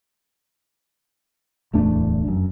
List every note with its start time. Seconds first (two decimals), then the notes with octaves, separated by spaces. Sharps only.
1.73 D1 E2 A3 D4
2.25 F1 F#2